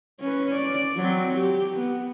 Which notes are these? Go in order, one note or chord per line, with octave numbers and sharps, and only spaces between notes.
C#4 B4
D5
F#3 C4
G4
B3